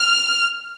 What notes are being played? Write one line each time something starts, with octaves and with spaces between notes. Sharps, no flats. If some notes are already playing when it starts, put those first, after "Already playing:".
Already playing: F6